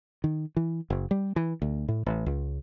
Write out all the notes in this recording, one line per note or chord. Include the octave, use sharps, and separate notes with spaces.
D#3
E3
F#1
G3
E3
D2
A2
A1
C#2